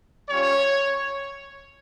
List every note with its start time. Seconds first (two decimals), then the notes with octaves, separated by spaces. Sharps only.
0.28 G3 C#4 F4 C#5